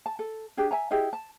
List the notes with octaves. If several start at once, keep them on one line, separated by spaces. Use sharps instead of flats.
A5
A4
D4 G4 G#4
E5 G#5 A#5
E4 G4 G#4 D#5
A5